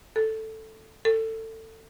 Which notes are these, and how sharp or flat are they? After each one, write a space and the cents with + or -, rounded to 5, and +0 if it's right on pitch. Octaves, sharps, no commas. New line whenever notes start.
A4 +5
A4 +25